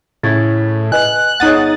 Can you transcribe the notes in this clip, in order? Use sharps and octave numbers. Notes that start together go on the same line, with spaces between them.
A2 C#3 E4 C#6 G#6 A6
B4 D#5 G#5 F#6
G1 D#4 G#4 C#5 F#5 D#6 A6